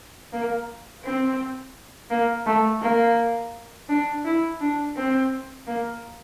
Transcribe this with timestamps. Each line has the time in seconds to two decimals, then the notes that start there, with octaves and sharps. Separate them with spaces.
0.32 A#3
1.04 C4
2.10 A#3
2.46 A3
2.82 A#3
3.89 D4
4.25 E4
4.61 D4
4.96 C4
5.67 A#3